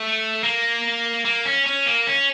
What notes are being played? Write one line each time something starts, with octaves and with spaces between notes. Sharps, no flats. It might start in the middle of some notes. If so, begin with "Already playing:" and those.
Already playing: A3
A#3
A#3
C#4
C#4
A#3
C#4